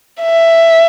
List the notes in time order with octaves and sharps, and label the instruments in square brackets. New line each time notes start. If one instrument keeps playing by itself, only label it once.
[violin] E5